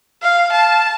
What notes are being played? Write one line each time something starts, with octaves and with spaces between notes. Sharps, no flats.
F5
A5